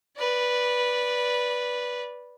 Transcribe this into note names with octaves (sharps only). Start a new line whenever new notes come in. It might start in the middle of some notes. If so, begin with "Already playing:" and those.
B4 D5